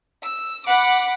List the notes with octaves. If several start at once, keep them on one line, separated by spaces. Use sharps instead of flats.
E6
F#5 B5 D6